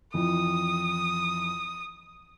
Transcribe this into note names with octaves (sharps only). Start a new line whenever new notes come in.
F2 E3 D#6